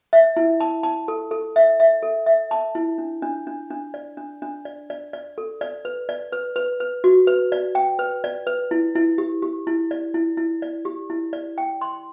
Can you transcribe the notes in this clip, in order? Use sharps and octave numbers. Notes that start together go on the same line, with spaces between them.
E5
E4
A5
A5
A4
A4
E5
E5
A4
E5
A5
E4
D4
D4
D4
D4
D5
D4
D4
D5
D5
D5
A4
D5
B4
D5
B4
B4
B4
F#4
B4
D5
G5
B4
D5
B4
E4
E4
G4
G4
E4
D5
E4
E4
D5
G4
E4
D5
G5
C6